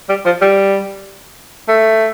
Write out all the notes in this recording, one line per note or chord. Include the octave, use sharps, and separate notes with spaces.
G3
F3
G3
A3